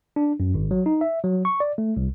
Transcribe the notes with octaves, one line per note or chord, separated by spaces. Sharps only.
D4
F#2
G#1
F#3
D#4
E5
F#3
C#6
D5
A3
C2